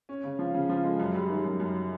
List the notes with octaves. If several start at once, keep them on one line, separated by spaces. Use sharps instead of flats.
C#4
C#3
F3
C#3
F3
G#3
F#2
G3
D#3
F#2
F#2